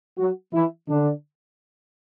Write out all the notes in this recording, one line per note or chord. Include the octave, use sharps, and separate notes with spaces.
F#3 F#4
E3 E4
D3 D4